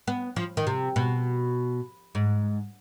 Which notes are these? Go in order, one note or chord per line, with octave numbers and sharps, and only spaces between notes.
B3
F3
D#3
C3
B2
G#2